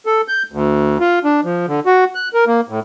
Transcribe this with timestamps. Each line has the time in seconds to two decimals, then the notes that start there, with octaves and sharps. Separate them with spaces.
0.06 A4
0.28 G6
0.52 D2
1.00 F4
1.24 D4
1.44 F3
1.68 D3
1.86 F#4
2.15 F#6
2.34 A#4
2.47 A#3
2.69 A2